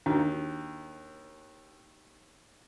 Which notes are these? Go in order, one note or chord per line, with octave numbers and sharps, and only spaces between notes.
D#2 D4 F#4